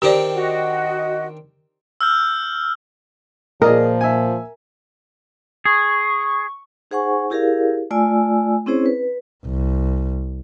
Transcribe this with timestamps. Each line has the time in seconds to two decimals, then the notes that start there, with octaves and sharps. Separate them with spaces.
0.02 D#3 C4 D4 G4 D5
0.35 F#4 D#5
2.01 E6 F6 G6
3.62 A#2 F3 G#4 A#4 D5 D#5
4.01 E5 G#5
5.65 G#4 C#6
6.91 D#4 G#4 C5 F#5 G#5 C#6
7.30 E4 G4 G#4 A#4 D5 F5
7.91 A3 F4 D5 G#5 E6
8.66 C4 C#4 E4 G#4 C5 C#5
8.86 B4
9.46 C2